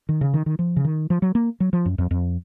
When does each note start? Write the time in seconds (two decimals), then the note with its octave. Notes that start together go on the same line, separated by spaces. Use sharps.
0.09 D#3
0.21 C#3
0.34 D#3
0.46 D#3
0.59 F3
0.76 C#3
0.85 D#3
1.10 F3
1.22 F#3
1.35 A#3
1.60 F#3
1.73 F3
1.86 F#2
1.98 F2
2.11 F2